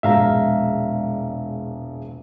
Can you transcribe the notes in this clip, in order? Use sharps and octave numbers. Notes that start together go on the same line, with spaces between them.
E1 A#1 G#3 E5 F5 A#5